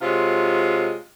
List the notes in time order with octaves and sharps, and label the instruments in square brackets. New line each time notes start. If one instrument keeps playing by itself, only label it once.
[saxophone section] C3 F#3 G#3 F4